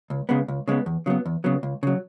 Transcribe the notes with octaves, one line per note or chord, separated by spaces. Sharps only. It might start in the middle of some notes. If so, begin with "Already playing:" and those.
C#2
C#3 G#3 B3
C#2
C#3 G#3 B3
E2
C#3 F#3 B3
E2
C#3 F#3 B3
C#2
C#3 F#3